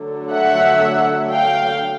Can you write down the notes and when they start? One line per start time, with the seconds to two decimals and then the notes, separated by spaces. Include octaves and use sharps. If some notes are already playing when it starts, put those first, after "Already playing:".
Already playing: D3 F#3 A3
0.32 E5 F#5
1.33 F5 G5